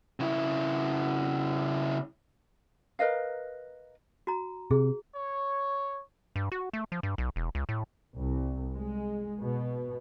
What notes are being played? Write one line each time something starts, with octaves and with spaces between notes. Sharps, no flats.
C#3 E4
A#4 B4 D#5 F5
F#4 A#5
C3 G#4
C#5
G2
F#4
A3
F3
G2
B1
E1
C#2
A2
C2
G#3
B2